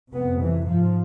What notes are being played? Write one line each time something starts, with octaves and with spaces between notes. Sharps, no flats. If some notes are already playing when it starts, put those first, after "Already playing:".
F2 C3 B3
E3
G#2 F3